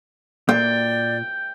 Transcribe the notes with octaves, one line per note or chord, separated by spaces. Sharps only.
A#2 D5 G5